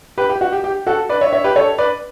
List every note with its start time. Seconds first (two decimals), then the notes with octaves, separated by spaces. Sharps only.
0.18 G4 B4
0.29 G4
0.41 F#4
0.52 G4
0.64 G4
0.87 F#4 A4
1.09 B4 D5
1.21 C#5 E5
1.33 C#5 E5
1.44 G4 B4
1.56 A4 C#5
1.78 B4 D5